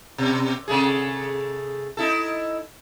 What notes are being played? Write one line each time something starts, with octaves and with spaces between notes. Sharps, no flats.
B2
C3 A3 G#4
D#4 E4 A4